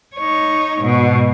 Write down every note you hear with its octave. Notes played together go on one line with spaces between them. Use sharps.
D#4 C#5
G#2 B2